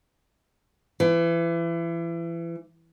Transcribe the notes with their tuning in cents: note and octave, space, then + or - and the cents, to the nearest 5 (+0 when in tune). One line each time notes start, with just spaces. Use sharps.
E3 +30